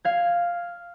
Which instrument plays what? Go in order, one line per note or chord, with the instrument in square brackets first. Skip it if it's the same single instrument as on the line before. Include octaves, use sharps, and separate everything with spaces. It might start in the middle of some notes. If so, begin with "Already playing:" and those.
[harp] F5 G#6